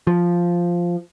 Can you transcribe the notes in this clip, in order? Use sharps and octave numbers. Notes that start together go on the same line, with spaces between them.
F3